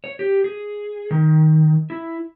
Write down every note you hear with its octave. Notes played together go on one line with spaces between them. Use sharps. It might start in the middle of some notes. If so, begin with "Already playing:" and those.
C#5
G4
G#4
D#3
E4